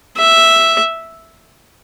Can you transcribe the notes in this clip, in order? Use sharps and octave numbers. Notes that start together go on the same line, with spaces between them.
E5